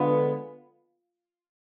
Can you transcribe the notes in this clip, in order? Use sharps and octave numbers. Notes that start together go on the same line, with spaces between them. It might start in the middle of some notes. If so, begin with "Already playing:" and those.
Already playing: D3 G#3 B3 F4